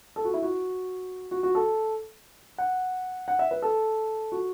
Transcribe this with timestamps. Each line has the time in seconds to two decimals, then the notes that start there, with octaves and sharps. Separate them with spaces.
0.16 A4
0.25 F#4
0.34 E4
0.42 F#4
1.31 F#4
1.43 F#4
1.55 A4
2.58 F#5
3.28 F#5
3.39 E5
3.51 B4
3.62 A4
4.32 F#4